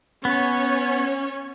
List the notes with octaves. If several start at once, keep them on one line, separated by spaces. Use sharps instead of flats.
B3 C#4 C#5